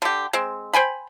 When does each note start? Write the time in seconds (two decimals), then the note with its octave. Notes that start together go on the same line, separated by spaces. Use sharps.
0.02 D3 G4
0.33 G#3 C4
0.73 C5 G5 G#5 B5